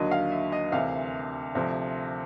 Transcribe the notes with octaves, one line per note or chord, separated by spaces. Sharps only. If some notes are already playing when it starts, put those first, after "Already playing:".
Already playing: D#2 D3 F#3 D#5
F5
E5
D#5
D2 C3 E3 F5
D2 C3 F3